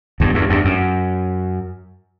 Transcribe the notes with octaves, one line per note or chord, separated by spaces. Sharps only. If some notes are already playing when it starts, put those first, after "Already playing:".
E2 G2
E2 G2
E2 G2
F#2